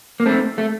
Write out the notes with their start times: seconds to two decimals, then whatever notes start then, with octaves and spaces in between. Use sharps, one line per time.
0.20 A#3
0.26 A3 C4
0.58 A3